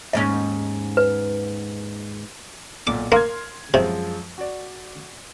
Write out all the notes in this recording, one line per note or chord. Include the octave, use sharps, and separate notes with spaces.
D#2 G#2 C#4 D#5
B4
B1 A#2 D6
A#3 C6 F6 G#6
F#2 C3 F3 G#3
F#4 D5